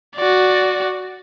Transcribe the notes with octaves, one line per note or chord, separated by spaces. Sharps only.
F#4 D5